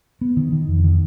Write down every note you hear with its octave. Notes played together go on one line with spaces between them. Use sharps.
B3
D#3
D#3
F2
D#3